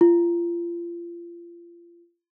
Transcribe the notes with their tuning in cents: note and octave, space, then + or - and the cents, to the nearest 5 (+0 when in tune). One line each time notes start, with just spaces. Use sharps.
F4 -30